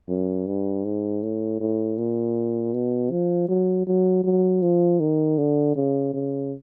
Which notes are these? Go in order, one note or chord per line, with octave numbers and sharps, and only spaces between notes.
F#2
G2
G#2
A2
A2
A#2
B2
F3
F#3
F#3
F#3
F3
D#3
D3
C#3
C#3